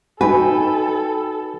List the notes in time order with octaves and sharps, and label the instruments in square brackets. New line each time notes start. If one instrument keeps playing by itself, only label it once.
[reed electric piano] D#4 F#4 [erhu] A4 [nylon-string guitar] B4 [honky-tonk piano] G5 G#5